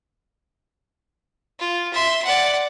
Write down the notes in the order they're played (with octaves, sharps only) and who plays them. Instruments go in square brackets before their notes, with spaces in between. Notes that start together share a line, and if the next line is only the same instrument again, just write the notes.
[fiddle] F4
E5 C6
D5 F#5